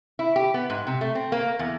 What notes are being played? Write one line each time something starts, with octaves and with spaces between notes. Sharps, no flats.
E4
G4
B3
G#2
C3
A3
C4
A#3
E2